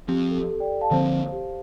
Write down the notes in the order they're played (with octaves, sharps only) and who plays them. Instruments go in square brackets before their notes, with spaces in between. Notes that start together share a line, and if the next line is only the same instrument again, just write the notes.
[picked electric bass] F3 C4 [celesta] G4
[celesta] A4
G4
A4
D5 G5
F5 A5
[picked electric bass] D3 F3 C4 [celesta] C5 F5
[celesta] G4